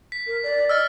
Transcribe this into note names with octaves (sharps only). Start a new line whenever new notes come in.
B6
A#4
D5
D#5 E6 F6 A6